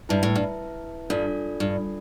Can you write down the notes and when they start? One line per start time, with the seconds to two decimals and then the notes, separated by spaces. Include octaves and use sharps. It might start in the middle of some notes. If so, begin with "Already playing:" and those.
0.09 G2 E4 B4 E5 A5
0.23 A2
0.36 G2
1.10 G2 D4 F4 A4 D5
1.60 G2